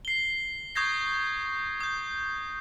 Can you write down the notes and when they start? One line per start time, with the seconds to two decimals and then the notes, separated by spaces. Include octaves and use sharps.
0.05 C7 G7
0.75 C#6 D#6 G6 G#6 A#6 C7
1.80 D#6 G6